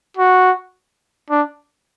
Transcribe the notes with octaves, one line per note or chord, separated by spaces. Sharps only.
F#4
D4